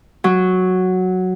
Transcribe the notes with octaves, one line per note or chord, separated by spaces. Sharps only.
F#3